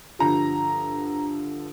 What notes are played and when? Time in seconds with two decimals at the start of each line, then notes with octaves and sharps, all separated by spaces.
0.19 G2 D3 F3 A#5